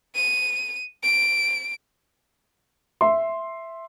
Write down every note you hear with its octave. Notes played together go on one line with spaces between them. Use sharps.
D#7
D7
E5 C6